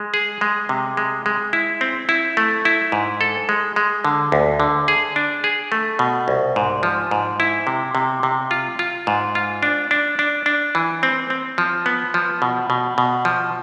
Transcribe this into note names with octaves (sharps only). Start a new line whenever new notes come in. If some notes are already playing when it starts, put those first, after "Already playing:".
Already playing: G#3
G#4
G#3
C3
G#3
G#3
E4
C4
E4
A3
E4
G#2
A4
G#3
G#3
D3
D2
D3
G#4
D4
G#4
A3
B2
C2
G#2
F3
G#2
E4
C3
C3
C3
F4
F4
G#2
F4
D4
D4
D4
D4
E3
C4
C4
F3
B3
F3
B2
B2
B2
F3